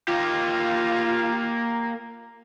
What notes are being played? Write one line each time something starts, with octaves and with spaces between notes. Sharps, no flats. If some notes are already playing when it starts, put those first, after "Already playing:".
A#3 F4 G4